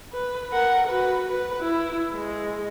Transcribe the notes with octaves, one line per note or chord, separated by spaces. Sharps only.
B4
A#4 F#5
F#4 B4
B4
E4
G#3